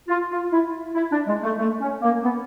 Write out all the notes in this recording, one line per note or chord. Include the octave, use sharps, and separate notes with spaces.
F4
F4
E4
E4
D4
G#3
A3
A3
C#4
A#3
B3